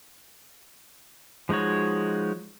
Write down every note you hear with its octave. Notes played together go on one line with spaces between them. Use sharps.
F3 G#3 D#4 F#4 C#5